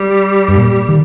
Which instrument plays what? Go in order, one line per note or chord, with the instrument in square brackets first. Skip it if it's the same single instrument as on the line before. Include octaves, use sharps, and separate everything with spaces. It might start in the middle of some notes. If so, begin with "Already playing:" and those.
Already playing: [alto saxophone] G3
[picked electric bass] G2
A#2
D#3